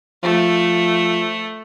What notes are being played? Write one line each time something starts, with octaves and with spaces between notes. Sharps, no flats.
F3 A3